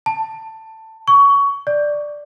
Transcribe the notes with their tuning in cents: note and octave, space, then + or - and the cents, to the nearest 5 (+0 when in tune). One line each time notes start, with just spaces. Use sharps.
A5 +15
C#6 +20
D5 +5